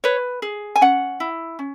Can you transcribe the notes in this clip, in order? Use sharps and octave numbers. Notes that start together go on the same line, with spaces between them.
B4 C#5
G#4
G#5
C#4 F#5
E4
C#4